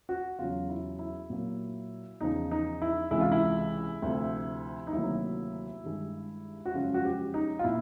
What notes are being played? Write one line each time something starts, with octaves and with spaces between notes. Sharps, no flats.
F#4
E2 C#3 F#3 F4
E4
E4
A#2 F#3 A#3
E2 C#3 F3 D#4
D#4
E4
C#2 C3 E3 G#3 E4
F4
E4
D2 C3 F3
D#4
D2 C3 D#3 F#3 A#3 E4
G2 D#3 G#3
F#4
F#2 C#3 F3 G#3 F4
F#4
G4
D#4
F4
A#2 E4